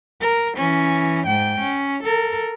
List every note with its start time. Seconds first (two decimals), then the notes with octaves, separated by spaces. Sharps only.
0.21 A#4
0.57 E3 C#4
1.27 G#2 G5
1.60 C#4
2.03 A4 A#4